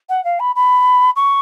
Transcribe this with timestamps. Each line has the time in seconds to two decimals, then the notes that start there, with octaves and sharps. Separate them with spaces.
0.09 F#5
0.24 F5
0.39 B5
0.55 B5
1.16 C#6